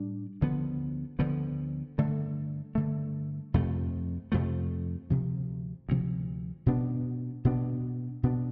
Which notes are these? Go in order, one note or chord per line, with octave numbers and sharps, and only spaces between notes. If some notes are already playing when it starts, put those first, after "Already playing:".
Already playing: A2 G3 D4
D2 D3 F3 B3
D2 D3 F3 B3
G2 D3 A3
G2 D3 A3
F2 C3 F3 A3
F2 C3 F3 A3
D2 C3 F3
D2 C3 F3
B2 B3 D4
B2 B3 D4
B2 B3 D4